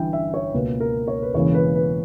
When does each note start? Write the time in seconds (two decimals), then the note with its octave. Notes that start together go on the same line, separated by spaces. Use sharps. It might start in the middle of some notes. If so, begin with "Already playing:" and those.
Already playing: G1 G2 E3 E5 G5
0.13 E5
0.34 C#5
0.53 C#2 B2 A#3 B4
0.80 A#4
1.08 C#5
1.23 B4
1.34 E1 E2 C#3 E3 A#3 C#5
1.54 B4
1.75 B4